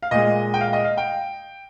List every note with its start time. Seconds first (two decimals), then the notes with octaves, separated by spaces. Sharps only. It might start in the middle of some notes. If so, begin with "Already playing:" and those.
0.03 F5
0.11 A#2 G#3 D#5
0.54 G5
0.61 F5
0.73 D#5
0.84 F5
0.97 G5